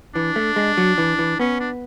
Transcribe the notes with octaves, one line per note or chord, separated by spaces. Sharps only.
E3 D4
A3
G#3
F#3
E3
E3
B3 C#4
D4